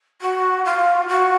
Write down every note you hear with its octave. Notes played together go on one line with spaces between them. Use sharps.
F#4
F4
F#4